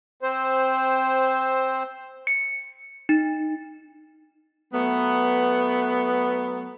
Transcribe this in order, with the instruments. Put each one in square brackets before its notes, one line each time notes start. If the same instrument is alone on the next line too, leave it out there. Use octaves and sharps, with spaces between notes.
[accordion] C4 C5
[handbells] C#7
D#4
[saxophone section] F#3 A3 B3